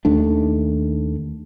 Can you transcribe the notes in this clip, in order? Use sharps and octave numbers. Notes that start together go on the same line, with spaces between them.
D#2 D#3 A3 D4